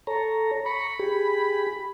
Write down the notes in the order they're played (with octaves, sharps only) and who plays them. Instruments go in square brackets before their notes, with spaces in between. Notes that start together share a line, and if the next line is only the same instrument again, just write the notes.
[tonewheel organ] A4 C#5 A#5
[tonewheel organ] A#5 C#6 [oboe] B5
[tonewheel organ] G4 G#4